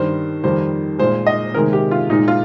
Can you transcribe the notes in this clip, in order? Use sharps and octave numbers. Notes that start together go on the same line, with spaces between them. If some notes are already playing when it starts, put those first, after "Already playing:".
Already playing: G2 D#3 G3 C5
F2 D#3 G3 C5
A#2 G#3 C5
D#5
C3 D#3 G#3 A#4
G4
F4
A#2 G#3 D#4
F4